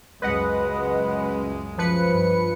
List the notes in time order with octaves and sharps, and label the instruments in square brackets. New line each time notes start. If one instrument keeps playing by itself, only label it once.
[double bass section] C#2 F#2 G#3 [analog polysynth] B4 D#5 F#5
[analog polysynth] F3 B4 C#7
[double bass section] G2